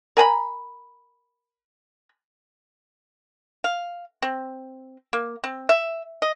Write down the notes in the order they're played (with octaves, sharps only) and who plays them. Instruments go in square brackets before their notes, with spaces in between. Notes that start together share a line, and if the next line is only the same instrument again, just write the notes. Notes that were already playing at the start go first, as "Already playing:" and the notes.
[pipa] A#4 G#5 A#5 B5
F5
C4
A#3
C4
E5
D#5